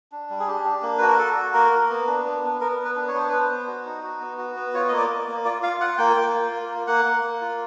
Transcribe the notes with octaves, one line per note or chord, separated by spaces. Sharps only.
D4
G3
G#4
D4 G4
D4
A#3
F#4 B4
A#4
F#4 A4
F#4
A#3 A#4
A#3
B3
D4
B3
B3
B3 A#4
B3
B4
D4
C#5
B3 C5
B3 B4
C5
B3
F#4
D#4
F#4
B3
F#4
B3
F4 C#5
A#3 D#5
D5
A#3
A#3
F4 D5
F4 F5
F4 F#5
A#3 G5
A#3
F4
A#3
A#3
A#3 F#5
A#3
A#3
F4